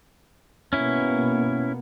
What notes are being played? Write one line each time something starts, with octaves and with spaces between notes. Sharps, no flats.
B2 A#3 B3 C#4 E4